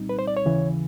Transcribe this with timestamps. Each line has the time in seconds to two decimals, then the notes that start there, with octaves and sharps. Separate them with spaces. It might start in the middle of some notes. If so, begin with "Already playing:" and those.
Already playing: C2 A#2 G3 C4 D#4
0.09 B4
0.19 C5
0.28 D5
0.37 C#5
0.45 D#2 C#3 E3